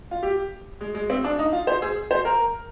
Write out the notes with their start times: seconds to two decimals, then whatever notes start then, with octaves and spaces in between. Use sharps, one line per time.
0.11 F4
0.23 G4
0.81 G#3
0.95 G#3
1.10 C4
1.24 D4
1.39 D#4
1.53 F4
1.67 C5
1.82 G#4
2.11 C5
2.25 A#4